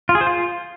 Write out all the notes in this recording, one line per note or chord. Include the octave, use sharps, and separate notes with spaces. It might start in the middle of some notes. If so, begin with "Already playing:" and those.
F4
G#4
C5
F4